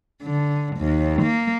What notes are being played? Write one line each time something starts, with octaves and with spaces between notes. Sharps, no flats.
D3
D#2
A#3